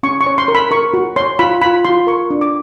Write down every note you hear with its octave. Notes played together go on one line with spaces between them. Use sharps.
C#4 C#6
C#6
C#5
C6
A#4
B5
A#4 C#6
F#4
C#5 C6
F4 B5
F4 B5
F4 C6
A#4 C#6
D4
D6